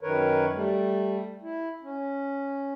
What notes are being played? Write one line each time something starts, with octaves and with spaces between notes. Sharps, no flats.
F#2 D#3 A#4 B4 C#5
G3 A3
E4
C#4